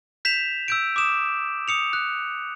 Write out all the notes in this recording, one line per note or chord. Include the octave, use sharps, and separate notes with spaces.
G6 B6 E7 F7
E6 G6 D7
D6 D#6 E7
D#6 C#7 F7
F#6